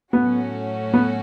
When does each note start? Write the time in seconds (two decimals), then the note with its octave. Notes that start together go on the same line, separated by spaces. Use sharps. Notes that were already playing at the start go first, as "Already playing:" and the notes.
0.13 A2 F#3 A3 B3 C#4 F#4
0.94 B3